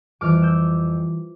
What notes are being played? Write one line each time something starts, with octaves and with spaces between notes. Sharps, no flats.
F2 E3 G3 D6 F6
E6 G6